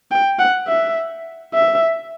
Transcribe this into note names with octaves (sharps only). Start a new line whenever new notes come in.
G5
F#5
E5
E5